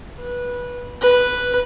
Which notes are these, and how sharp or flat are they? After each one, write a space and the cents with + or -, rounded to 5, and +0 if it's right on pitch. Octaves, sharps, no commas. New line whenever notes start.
B4 -15
B4 +0